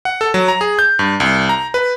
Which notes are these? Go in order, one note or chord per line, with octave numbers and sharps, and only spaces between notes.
F#5
A4
F#3
A#5
G#4
G6
G2
C2
A#5
B4